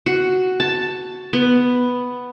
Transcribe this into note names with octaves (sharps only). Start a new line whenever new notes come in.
F#4
A5
B3